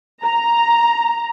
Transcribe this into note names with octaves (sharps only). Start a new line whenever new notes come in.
A#5